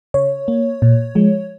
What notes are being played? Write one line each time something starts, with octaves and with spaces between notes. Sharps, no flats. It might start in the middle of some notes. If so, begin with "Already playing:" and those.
C#3 C#5
A#3
A#2
F3 G#3